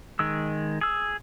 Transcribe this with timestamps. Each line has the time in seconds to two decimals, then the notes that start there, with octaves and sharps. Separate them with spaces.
0.19 D#3 G#3 E6
0.81 G#4 E6